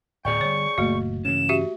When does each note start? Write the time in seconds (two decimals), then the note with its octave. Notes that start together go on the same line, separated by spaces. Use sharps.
0.25 D1 A2 G#4 D5 G5 C#6
0.41 D3 G3 C#5
0.78 F#1 A#2 A3 A#3 F#4
1.25 G2 C#3 E3 E7
1.49 F#4 G4 E5